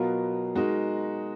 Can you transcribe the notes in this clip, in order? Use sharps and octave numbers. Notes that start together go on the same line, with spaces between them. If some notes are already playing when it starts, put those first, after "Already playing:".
Already playing: B2 F#3 B3 F4 A#4
G#3 D#4 F#4 A#4 D#5